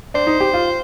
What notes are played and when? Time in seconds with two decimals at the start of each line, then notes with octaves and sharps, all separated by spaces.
0.14 D4 C5
0.27 D#4
0.40 G4
0.54 F4